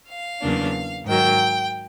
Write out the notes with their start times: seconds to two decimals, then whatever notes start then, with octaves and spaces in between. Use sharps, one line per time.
0.10 F5
0.42 E2 C#3 F#3 A#3 D4
1.05 G#2 D#3 F#3 G5